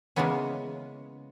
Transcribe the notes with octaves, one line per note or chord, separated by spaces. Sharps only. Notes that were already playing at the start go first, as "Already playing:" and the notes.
C#3 E3 G#3 A#3 B3 C#4